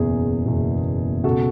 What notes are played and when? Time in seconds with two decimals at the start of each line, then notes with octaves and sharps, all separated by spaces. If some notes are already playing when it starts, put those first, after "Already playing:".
Already playing: F#1 E2 B2 G#4
0.46 F#1 E2 B2
1.24 C#2 B2 F#4 A4